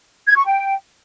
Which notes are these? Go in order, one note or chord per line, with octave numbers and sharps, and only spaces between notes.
G#6
C#6
G5